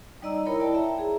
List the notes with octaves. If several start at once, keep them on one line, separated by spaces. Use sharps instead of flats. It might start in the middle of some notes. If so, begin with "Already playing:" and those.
G3 D#4 D5 D#5 A#5 E6
E4 A#4 C#5 A#5 B5
E4 D5 G5 A5
E5 A#5
G#4